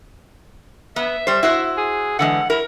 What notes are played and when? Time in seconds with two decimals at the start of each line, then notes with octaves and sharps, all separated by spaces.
0.96 B3 E5
1.27 G3 C5
1.43 E4 F#4 C5
1.77 G#4
2.19 D3 E3 G#3 F#5
2.50 E4 A#4